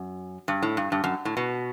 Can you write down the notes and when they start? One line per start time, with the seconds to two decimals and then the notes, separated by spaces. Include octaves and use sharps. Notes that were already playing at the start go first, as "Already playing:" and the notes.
Already playing: F#2
0.48 G2
0.63 A2
0.77 G2
0.92 G2
1.04 F#2
1.25 A2
1.37 B2